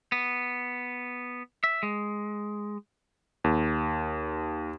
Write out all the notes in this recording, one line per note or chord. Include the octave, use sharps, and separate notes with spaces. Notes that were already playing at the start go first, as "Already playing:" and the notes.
B3
E5
G#3
D#2